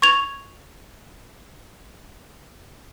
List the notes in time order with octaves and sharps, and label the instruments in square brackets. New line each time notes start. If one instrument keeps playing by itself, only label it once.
[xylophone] C#6 G#6 F7